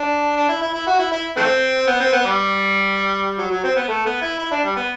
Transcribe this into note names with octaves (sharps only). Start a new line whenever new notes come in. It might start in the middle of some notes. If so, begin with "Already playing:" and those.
Already playing: D4
D4
E4
E4
E4
F#4
E4
E4
E3 A3 C4
B3
C4
B3
G3
F#3
F#3
C4
B3
A3
B3
E4
E4
D4
G3
B3